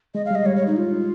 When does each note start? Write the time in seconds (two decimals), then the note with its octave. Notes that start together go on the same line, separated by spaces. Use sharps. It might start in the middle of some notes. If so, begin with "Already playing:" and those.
0.15 G#3 D#5
0.25 F5
0.31 G3 D#5
0.46 G3 C#5
0.56 C#5
0.67 D#4
0.77 F4